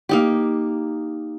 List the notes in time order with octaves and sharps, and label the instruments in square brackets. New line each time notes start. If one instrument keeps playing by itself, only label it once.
[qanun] A#3 D#4 G4